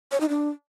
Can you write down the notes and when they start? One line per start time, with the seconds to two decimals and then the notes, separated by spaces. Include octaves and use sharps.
0.12 C#5
0.20 D#4
0.29 D4